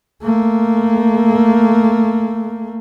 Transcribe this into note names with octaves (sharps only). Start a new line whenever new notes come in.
A3 A#3